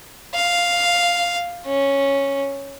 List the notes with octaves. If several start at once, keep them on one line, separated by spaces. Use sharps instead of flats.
F5
C#4